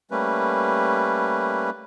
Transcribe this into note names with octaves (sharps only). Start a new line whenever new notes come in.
G3 A3 A#3 C#4 B4